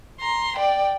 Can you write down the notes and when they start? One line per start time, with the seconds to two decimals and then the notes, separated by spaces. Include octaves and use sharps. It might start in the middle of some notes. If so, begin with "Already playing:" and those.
0.20 A#5 C6
0.57 D5 G5